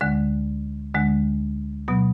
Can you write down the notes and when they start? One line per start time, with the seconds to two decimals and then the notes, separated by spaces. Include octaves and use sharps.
0.01 D2 D3 G#3
0.95 D2 D3 G#3
1.88 B2 F#3 B3